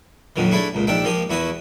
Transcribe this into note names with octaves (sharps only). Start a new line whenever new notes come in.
F2 A#2 D3 D#3 F#3
A3 D4 E4 G#4
C#2 A#2
A#1 D#3 D4 E5 G5
F3 A#3 G4 D#6
E2 E4 F#4 B5 D#6